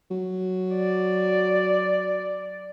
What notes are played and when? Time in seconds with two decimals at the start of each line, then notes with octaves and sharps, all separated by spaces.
0.11 F#3
0.76 D5